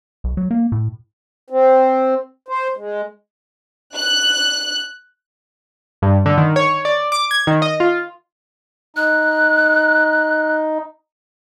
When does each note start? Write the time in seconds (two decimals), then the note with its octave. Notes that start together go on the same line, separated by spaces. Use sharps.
0.24 B1
0.37 F#3
0.51 A#3
0.72 A2
1.50 C4
2.48 C5
2.77 G#3
3.96 F#6
6.02 G2
6.26 D3
6.38 D#3
6.56 C#5
6.85 D5
7.12 D6
7.31 G#6
7.47 D#3
7.62 D#5
7.80 F4
8.97 D#4 F#6